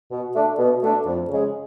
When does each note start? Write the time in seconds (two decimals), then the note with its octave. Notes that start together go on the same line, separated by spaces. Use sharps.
0.11 B2
0.35 A3 D4
0.59 B2
0.82 A3 D4
1.06 F2
1.29 C#3 G#3